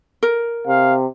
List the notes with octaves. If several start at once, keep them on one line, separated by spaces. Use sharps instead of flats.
A#4
C3 F5